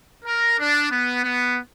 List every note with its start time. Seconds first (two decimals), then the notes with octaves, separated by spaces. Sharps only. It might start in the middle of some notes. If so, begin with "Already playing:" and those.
0.25 A#4
0.59 D4
0.91 B3
1.23 B3